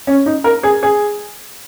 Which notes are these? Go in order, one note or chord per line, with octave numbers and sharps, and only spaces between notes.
C#4
D#4
A#4
G#4
G#4